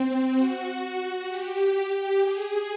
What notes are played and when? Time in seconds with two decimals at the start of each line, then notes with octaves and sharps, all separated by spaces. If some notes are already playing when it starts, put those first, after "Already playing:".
Already playing: C4
0.33 F#4
1.27 G4
2.20 G#4